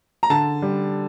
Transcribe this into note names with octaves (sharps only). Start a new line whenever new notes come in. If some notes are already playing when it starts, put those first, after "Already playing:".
A#5
D3 A5
G3